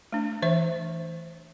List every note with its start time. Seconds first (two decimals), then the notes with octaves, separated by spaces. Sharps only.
0.12 A3 D4
0.42 E3 C5 E5